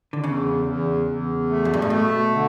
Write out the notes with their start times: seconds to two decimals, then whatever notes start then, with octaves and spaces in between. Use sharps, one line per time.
0.13 D3
0.23 E2 C#3
0.65 E2
1.07 E2
1.49 A3
1.65 F#2
1.74 G2
1.82 A2
1.90 B2 A3
2.33 D3